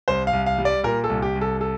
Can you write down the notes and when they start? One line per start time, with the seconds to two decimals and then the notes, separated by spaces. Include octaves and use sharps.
0.08 C2 C5
0.27 F5
0.33 C2
0.46 F5
0.58 G3
0.65 D5
0.84 A#2 A#4
1.04 A4
1.10 C2
1.22 G4
1.36 C2
1.41 A4
1.61 A4